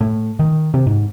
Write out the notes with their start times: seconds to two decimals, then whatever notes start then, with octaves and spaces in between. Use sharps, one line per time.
0.01 A2
0.39 D#3
0.74 C3
0.86 G#2